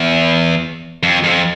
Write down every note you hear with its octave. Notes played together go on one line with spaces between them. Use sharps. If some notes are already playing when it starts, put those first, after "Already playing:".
Already playing: E2
F2
F2